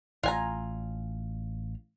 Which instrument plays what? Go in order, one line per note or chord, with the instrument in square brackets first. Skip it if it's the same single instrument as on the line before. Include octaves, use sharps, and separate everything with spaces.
[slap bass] A1 [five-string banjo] F4 G#5 A#5